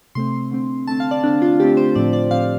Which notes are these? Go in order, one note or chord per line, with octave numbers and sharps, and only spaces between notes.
C3 A3 C4 C6
D3 A3 C4
D3 A3 C4 A5
F5
D5
D3 A3 C4 D4
F4
D3 A3 C4 G4
C5
A2 F3 C4 D5
D5
A2 F3 C4 F5